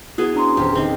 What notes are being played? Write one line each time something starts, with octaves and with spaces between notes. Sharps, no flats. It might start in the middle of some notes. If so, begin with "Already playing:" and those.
B3 E4 F#4 G#4
C#4 D4 A#5 C6
D#1 E2 G4
D#3 C4